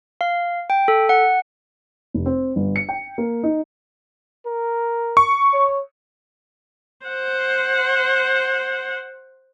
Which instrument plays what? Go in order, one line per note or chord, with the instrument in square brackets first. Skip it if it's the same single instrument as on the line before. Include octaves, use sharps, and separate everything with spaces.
[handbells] F5
G5
A4
F#5
[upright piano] F1
C4
G1
C#7
G5
A#3
D#4
[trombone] A#4
[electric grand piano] C#6
[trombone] C#5
[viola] C5 F#5